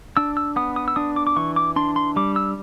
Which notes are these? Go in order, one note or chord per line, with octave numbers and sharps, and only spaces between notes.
D4 E6
E6
B3 D#6
D#6
E6
D4 D#6
D6
D6
E3 C#6
D6
D4 C6
C6
G3 D6
E6